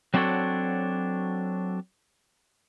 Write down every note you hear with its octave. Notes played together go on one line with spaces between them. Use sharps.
F#3 C4 D4 F#4 A4 C#5